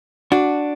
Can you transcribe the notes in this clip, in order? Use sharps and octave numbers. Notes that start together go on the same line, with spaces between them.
D4 F#4